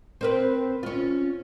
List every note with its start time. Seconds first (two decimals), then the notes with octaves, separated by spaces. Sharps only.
0.21 C4 A#4 B4
0.83 C#4 F4